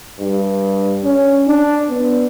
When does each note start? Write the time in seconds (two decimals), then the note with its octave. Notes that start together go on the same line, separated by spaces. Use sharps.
0.20 G2
1.04 C#4
1.48 D4
1.90 B3